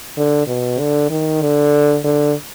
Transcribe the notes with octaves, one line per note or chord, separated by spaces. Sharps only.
D3
B2
D3
D#3
D3
D3